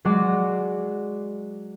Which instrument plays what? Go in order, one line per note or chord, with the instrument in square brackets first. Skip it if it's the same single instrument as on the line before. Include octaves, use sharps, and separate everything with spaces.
[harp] F#3 G#3 F#4 D5